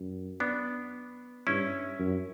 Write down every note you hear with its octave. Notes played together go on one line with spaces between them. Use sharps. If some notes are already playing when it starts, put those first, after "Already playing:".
Already playing: F#2
B3 D4
G2 C#4 E4
F#2